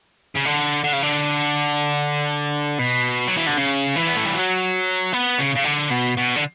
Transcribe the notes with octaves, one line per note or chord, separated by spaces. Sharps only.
C#3
D3
D3
C#3
D3
B2
F#3
E3
D3
C#3
E3
B3
A3
G3
F#3
B3
C#3
C#3
D3
B2
B2
D3